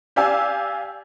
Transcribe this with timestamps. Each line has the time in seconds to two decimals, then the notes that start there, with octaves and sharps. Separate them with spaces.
0.16 G4 D5 F5 G#5 E6